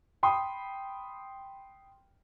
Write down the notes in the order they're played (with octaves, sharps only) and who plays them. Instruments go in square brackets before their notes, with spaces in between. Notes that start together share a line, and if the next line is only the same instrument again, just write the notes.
[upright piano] G5 B5 C6 D#6